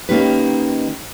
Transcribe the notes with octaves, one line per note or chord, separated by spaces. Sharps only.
D#3 A#3 C#4 D#4 G4 B4